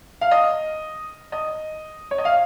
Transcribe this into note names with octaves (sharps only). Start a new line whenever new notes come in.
F5
D#5
D#5
C#5
D#5
F5